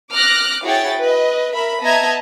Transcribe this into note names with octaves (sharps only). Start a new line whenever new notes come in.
D6 F6 F#6 A#6
E4 F#4 G#4 C#5 G5 A6
B4 D#5
A#4 E5 B5
B3 D#5 E5 A5 A#5 G#6